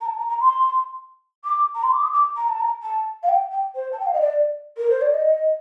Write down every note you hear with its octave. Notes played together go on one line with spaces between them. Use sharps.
A#5
A5
A#5
A#5
C6
D6
A#5
C6
D6
D#6
D6
A#5
A5
A#5
A5
F5
G5
G5
C5
A5
G5
F5
D#5
D5
A#4
C5
D5
D#5